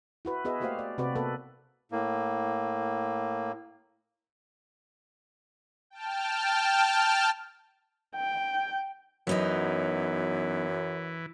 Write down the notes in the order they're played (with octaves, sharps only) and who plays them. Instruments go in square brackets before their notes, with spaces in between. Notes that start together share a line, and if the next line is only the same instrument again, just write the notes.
[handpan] E4 F#4 B4
B3 F#4 G#4 B4 D#5 E5
A3 A#3 F#4 G4 C5 F5
D5
C3 C4 F#4 B4 D5
A#3 B3 A4 B4
[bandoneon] A2 A#3
[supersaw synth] G5 A5 F6
[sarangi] G5
[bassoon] F#2 [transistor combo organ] E3 [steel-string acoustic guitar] F#3 B3 D#4